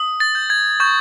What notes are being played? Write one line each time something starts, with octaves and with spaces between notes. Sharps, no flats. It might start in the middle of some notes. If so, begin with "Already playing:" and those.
Already playing: D#6
A6
G6
G#6
C#6 G6